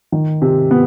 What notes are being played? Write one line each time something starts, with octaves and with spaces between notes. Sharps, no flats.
D#3
C3
B3